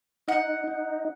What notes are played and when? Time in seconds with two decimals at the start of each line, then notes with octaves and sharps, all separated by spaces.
0.28 D#4 F#5
0.68 D#4